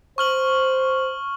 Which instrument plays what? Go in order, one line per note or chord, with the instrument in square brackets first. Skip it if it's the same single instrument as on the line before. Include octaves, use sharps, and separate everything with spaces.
[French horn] C5 [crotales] C#6 F6 F#7